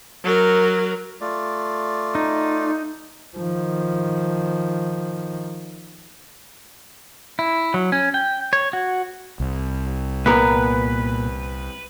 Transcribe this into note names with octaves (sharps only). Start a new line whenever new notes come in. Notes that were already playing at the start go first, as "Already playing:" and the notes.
F#3 A#4
A3 F4 D5
D#4
D#3 F3
E4
F#3
C#4
G5
C#5
F#4
C2
A#2 B3 A#4 B4